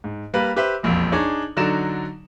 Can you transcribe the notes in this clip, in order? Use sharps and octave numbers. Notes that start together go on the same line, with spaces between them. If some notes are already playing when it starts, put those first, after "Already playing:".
G#2
G3 A#3 B4
G4 B4 C5 E5
E1 A#1 F2
D4 D#4 G#4 C#5
D3 F#3 D#4 D5 E7